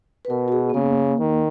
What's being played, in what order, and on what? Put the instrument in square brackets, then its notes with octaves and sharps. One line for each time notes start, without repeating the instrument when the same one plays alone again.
[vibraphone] B4
[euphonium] B2 [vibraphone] A#4
[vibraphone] F#4
G#4
B3
[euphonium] C#3 [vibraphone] A#3
[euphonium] D#3